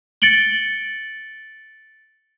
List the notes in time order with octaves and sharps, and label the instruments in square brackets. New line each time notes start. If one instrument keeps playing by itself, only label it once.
[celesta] A6 C#7 D7 F#7 G7